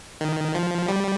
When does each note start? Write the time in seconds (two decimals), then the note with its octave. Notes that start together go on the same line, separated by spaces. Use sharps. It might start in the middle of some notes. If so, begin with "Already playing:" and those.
0.21 D#3
0.55 F3
0.88 G3